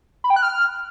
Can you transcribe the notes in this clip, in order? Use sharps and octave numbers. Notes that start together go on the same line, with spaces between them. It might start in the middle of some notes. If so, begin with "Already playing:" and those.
B5
G5
F#6
F6